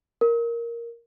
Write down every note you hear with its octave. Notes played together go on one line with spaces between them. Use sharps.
A#4